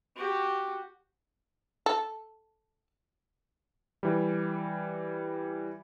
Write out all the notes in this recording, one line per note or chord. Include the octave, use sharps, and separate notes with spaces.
F#4 G4
A4
E3 G3